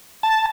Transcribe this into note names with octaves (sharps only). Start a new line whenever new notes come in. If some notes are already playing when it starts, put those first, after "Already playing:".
A5